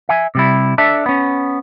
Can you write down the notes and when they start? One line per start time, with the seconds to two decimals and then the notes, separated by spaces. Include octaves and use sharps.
0.09 E5 G#5
0.35 C3 G3 E4
0.78 D4 A4 E5
1.06 B3 C#4